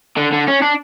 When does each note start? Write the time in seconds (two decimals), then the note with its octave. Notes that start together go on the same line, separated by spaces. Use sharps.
0.17 D3
0.32 D3
0.48 C#4
0.62 D4